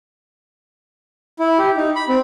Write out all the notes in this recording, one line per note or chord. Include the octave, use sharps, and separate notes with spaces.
E4
G4
D#4
B5
C4